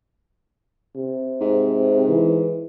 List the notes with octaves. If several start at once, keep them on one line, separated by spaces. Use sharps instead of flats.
C3
G#2
E3